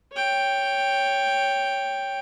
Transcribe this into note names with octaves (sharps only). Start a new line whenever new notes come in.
C#5 G5